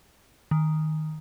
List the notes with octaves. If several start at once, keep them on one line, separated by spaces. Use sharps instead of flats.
D#3